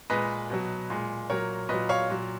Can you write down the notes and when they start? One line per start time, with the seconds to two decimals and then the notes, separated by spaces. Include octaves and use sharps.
0.10 A#2 G#3 B4 D#5
0.50 B2 F#3
0.90 A#2 G#3
1.29 A#2 F#3 A#4 C#5
1.69 A#2 F#3 B4 D#5
1.89 C#5 F5
2.09 A#2 F#3